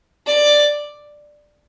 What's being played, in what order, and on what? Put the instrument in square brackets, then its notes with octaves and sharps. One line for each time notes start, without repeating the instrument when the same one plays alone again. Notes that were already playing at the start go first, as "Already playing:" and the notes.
[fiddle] D5